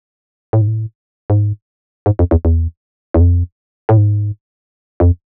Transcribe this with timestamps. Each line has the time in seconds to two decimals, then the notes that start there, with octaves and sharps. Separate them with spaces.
0.53 A2
0.61 G#2
0.67 A2
1.30 G#2
2.06 G#2
2.19 F2
2.31 E2
2.45 E2
3.14 E2
3.21 F2
3.89 A2
3.97 G#2
5.00 F2